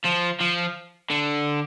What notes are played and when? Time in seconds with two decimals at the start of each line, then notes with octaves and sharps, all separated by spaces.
0.04 F3
0.40 F3
1.10 D3